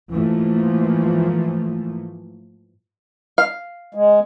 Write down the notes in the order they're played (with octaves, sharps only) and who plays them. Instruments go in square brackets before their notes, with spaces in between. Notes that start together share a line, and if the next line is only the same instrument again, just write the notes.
[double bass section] G#2 E3 F3 A3 A#3
[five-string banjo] F5
[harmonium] G#3